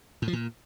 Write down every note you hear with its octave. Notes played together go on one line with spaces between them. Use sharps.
A2
F3
A#2